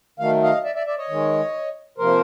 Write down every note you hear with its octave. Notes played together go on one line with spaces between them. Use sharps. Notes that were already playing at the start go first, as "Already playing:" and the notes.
D#3 F#3 A3 F5
D#5 F5
D5 E5
D5 E5
D5 E5
C#5 D#5
D#3 G#3
C3 F3 A#3 A#4 C5